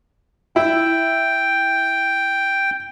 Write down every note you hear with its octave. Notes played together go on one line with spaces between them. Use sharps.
E4 G5